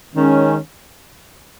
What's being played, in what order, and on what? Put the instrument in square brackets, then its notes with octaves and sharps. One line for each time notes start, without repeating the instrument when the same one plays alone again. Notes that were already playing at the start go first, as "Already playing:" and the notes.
[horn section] D#3 G#3 C#4